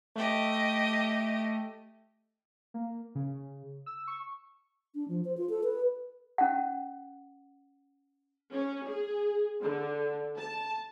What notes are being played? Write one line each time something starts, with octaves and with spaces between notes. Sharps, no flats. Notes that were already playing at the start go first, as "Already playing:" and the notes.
A3 G4 D#5
A#3
C#3
E6
C#6
D4
F3
C5
F4
A4
B4
C#4 F#5
C#4
G#4
D3
A5